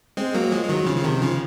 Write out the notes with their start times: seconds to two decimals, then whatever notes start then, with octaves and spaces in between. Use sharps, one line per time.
0.17 G#3 C4
0.34 F#3 A#3
0.52 F3 G#3
0.64 G#3
0.69 D#3 F#3
0.87 C#3 F3
0.97 F3
1.04 C3 D#3
1.21 C#3 F3